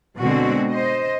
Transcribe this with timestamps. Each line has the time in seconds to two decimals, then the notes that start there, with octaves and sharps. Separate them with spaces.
0.18 B2 D3 G#3 C4 F#4
0.70 C5 D#5